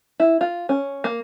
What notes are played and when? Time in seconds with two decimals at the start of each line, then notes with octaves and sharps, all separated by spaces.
0.20 E4
0.41 F4
0.69 C#4
1.04 A#3